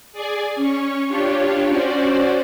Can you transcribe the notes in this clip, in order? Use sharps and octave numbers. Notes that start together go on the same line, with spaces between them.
G#4 D5 G#5
C#4 C#5
D4 F4 G4 C#5
C#4 F#4 C5 D5